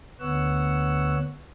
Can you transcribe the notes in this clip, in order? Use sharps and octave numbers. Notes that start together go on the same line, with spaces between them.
D2 B3 C#5 F#5 E6